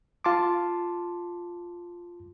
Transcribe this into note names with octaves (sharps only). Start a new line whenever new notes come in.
F4 A5 C6 D6